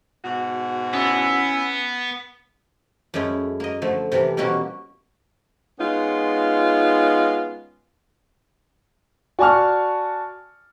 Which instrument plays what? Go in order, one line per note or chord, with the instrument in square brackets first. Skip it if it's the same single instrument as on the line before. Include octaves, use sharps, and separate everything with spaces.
[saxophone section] G#2 B2 F#4
[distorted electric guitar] B3 [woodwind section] C#4 E4
[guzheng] F#2 G#3 A3 C#4 E4
A#3 D#5
D3 F3 A3
C3 E3 F3 G3
B2 E3 G3 A#3 C#4 F#4
[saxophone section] G#3 B3 C#4 D#4 F4
[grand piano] F#4 D5 G#5 A5 C#6 F6